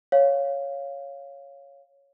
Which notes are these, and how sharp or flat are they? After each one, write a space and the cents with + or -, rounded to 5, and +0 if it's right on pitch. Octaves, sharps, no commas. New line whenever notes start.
C#5 +0 F5 +0